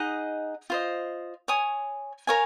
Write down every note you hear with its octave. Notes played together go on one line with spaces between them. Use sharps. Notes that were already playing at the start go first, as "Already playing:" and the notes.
Already playing: D#4 G#4 D#5 F#5
F4 C5 D#5
C#5 G#5 D#6
A#4 C#5 F5 G#5